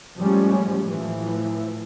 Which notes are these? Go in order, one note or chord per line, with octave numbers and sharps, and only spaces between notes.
A2 F3 G3 G#3 C#4
A2 E3 F3